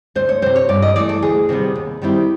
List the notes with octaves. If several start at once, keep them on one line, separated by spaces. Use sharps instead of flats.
D2 C5
C#5
C3 E3 C5
C#5
G2 D5
D#5
E3 A3 D5
A4
D2 G#4
C3 D#3 G3 B3
D#2
D#3 G3 C4 E4